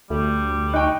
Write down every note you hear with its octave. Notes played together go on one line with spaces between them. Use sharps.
D2 G3 A3 F#4 A4
D#4 G5 C#6 F#6